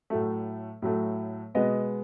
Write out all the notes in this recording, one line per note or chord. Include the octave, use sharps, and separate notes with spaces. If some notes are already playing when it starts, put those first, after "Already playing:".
A2 F#3 A3
A2 F#3 A3
B2 G#3 B3 D#5